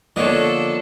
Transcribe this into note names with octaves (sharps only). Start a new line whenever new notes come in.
D3 F3 A#3 B3 D4 A4 C#5 D#5